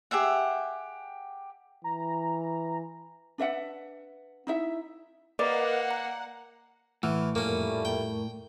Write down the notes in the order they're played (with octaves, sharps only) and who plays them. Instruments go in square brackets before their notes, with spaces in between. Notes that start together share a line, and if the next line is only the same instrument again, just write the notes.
[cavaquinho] G4 G#4 E5 F#5
[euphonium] E3 [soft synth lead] A#5
[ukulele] D4 B4 E5 F#5
D#4 E4 E5
[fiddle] A#3 [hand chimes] A#4 B4 D#5 [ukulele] D5 [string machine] F#5
[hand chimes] A#5
[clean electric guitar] A2 [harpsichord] E3 [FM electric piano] F#5 E6 F6
[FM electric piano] F2 A#4 C#6 [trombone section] A#2 G3 A3 [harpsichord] A#3 C#4
[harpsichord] G5